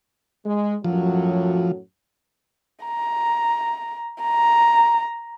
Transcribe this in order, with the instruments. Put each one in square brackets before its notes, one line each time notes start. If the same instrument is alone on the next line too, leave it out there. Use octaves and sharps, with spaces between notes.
[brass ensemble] G#3
[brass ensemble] F#2 A2 F#3 [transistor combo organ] F3
[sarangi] A#5
A#5